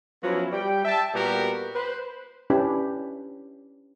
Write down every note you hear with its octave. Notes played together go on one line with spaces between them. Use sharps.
F3 F#3 B3 C#4 E4
G3 G5
E5 G5 A5
A#2 G3 B3 F#4 G4 A#4
B4 C5
C#4 D4 E4 G4 B4